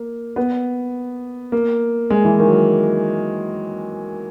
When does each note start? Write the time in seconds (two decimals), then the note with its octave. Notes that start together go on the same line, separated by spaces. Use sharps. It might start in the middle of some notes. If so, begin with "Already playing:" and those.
Already playing: A#3
0.36 B3
1.52 A#3
2.10 G#3
2.25 E3
2.40 D#3
2.47 F#3